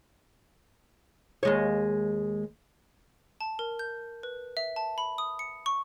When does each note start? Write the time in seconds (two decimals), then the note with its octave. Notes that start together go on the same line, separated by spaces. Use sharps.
1.43 D#2 G#3 C#5
3.41 A5
3.59 A#4
3.79 G6
4.23 B4
4.57 E5
4.76 A5
4.98 B5
5.18 D#6
5.39 C#7
5.66 C#6